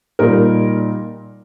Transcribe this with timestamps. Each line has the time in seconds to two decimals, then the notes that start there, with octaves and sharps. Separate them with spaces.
0.19 A#2 G3 A#3 D#4 A#4